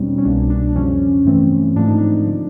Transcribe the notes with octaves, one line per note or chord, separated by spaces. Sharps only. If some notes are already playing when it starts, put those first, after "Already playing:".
Already playing: E2 B2 G3 C4 C#4 D#4
C#4
C2 B2 G3 A#3 D4
D4
F2 C#3 F3 C#4
G2 E3 A3 C4
G#2 F3 A3 C4 D4
D#4
D4
C#3 F3